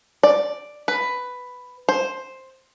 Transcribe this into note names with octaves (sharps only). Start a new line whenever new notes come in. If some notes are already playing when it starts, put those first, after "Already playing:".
D5
B4
C5